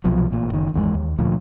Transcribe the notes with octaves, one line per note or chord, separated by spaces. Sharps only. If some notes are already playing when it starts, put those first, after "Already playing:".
C2 B2 F3 F#3
A1 A#2
F#1 D#3
G#1 E2 D3 G#3
D#2
D2 A#2 F3